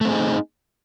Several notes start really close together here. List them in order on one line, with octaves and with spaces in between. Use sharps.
A3 C4 G#4 D#4